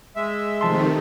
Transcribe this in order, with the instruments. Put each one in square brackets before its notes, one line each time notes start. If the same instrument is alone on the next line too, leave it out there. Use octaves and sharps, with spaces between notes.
[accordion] G#3 E5
[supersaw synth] C3 D#3 A3 [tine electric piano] F3 A5 C6